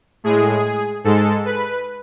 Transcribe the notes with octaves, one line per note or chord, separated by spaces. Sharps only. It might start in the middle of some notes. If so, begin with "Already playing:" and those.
A2 G#3 G#4
G#2 G#3 A4
B4